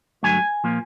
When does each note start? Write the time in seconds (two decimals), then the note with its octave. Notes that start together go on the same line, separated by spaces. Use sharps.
0.23 G2 D3 F#3 A3 G#5
0.64 A#2 F3 A#3